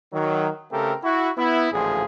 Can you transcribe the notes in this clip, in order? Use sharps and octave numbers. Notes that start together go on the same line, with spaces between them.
D#3 F#3
C#3 A3 C4 G4 A4 A#4
E4 F#4
B3 E4
A1 D2 A#2 F3 G#4